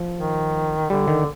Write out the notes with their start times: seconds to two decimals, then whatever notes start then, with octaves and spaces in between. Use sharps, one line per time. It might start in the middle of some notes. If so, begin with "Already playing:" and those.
Already playing: F3
0.18 D#3
0.90 D3 G3
1.08 D#3